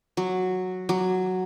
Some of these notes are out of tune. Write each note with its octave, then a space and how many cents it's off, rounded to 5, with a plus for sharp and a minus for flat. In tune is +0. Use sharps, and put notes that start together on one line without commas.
F#3 -5
F#3 +0